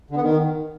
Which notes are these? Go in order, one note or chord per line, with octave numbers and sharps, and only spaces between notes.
D3
B3
D#3